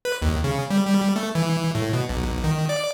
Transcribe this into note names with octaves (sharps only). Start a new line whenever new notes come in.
B4
D#2
C#3
G3
G3
A3
E3
A2
B2
B1
D#3
D5